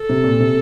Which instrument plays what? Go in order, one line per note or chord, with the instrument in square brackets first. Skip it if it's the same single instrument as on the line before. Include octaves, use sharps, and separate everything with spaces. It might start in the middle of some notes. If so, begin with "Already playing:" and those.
Already playing: [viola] A4
[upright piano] C3
A#2
C3